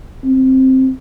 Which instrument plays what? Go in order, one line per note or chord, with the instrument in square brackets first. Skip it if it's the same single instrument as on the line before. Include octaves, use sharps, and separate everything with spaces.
[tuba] C4